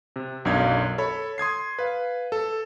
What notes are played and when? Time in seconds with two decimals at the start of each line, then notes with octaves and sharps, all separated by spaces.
0.16 C3
0.45 B1 F#2 D4 F5 G#6
0.98 A4 C#5 B5
1.38 C6 D#6 G#6 C7
1.79 B4 F5
2.32 A4